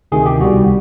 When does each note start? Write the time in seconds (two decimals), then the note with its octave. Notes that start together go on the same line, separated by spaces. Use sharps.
0.12 D2 C3 D#3 G#4
0.26 G4
0.40 C2 B2 G3 F#4